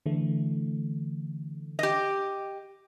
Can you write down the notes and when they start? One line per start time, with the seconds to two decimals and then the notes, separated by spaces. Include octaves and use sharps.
0.06 D3 E3 A3
1.79 G4 D#5